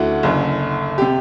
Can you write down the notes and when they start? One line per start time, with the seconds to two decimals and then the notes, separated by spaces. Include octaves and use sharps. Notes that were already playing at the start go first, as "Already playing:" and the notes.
Already playing: D2 D3 E4 F#4
0.23 F#1 F#2 D3
0.98 C3 G4